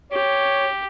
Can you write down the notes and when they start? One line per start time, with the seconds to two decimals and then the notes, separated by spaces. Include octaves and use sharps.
0.12 G4 C#5